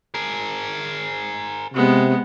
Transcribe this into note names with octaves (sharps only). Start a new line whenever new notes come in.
G#4 A#4
C3 G#3 B3